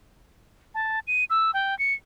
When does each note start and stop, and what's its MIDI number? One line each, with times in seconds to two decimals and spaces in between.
0.75 0.99 81
1.07 1.24 99
1.30 1.51 88
1.54 1.77 79
1.79 1.94 97